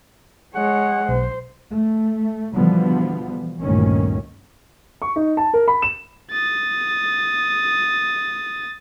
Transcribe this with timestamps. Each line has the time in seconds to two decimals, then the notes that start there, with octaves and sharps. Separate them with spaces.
0.55 G#3 C#5 F#5
1.09 B1 C5
1.71 A3
2.54 B2 D3 E3 F3 G3 B3
3.60 G1 D2 A#2 D#3 C#4
5.02 C#6
5.16 D#4
5.37 A5
5.54 A#4
5.68 B5
5.82 E7
6.31 D#6 A6